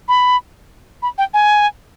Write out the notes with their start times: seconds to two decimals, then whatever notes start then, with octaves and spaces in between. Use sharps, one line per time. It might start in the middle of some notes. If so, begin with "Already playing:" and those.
0.08 B5
1.02 B5
1.18 G5
1.34 G#5